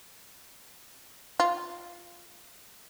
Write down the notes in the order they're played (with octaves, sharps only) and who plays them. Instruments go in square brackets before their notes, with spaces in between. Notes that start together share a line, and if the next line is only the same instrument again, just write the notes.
[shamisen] F4